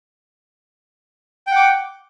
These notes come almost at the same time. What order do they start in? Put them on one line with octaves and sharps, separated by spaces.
G5 F#5 D6